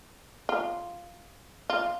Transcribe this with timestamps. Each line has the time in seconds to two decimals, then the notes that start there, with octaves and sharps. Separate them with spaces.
0.49 F4
1.70 F4